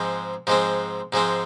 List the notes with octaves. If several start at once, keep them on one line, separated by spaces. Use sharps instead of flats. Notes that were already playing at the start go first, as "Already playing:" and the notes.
Already playing: G#2 F3 G#3 C4
G#2 F3 G#3 C4
G#2 F3 G#3 C4